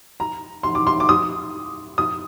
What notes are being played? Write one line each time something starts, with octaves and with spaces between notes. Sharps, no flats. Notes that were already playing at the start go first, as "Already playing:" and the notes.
A#5
C6
D6
C6
D6
D#6
D#6